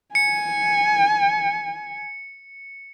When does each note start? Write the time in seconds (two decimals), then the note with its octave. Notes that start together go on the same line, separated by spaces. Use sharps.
0.15 G#5 C#7